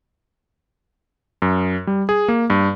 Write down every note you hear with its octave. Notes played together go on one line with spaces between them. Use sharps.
F#2
G3
G#4
A#3
G2